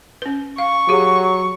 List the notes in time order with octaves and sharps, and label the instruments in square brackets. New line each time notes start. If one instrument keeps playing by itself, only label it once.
[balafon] C#4 B4
[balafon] F5 [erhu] C#6
[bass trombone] F#3 [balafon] G4 G#4